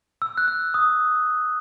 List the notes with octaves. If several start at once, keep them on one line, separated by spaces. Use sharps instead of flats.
E6
F#6
E6
D#6